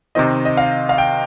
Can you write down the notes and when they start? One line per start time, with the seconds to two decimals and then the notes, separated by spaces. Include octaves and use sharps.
0.15 C3 D#3 C4 D#5
0.45 D#5
0.57 F5
0.89 F5
0.98 G5